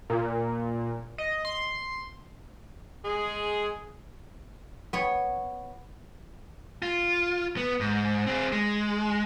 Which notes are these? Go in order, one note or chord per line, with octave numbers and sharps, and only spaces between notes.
A#2
D#5
C6
G#3 G#4
B3 C#5
F4
B3
G#2
C4 G#4
G#3